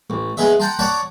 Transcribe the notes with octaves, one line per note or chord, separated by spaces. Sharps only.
A1
G#3 B3 G#4 D#5 E5
F#5 G5 A5 A#5 C6
C#5 D5 F#5 A5 A#5 D6